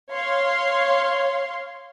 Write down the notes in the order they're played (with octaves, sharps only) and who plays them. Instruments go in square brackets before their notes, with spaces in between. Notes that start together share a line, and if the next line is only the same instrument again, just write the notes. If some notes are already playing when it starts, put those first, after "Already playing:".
[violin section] C#5 F5 C6